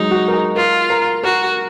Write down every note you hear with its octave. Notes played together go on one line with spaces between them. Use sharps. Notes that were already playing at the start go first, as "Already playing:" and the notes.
Already playing: F#3 G#3 D#4
F#4
A#4
G#4
F4 A#4
A#4
F#4 A#4